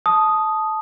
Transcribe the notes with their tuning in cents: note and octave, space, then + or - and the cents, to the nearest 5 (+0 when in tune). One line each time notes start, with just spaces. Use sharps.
A5 -15 D#6 +0